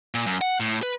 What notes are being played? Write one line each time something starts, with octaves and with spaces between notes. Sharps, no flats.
A#2
F#2
F#5
A2
B4